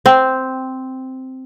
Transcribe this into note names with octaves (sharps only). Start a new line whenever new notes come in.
C4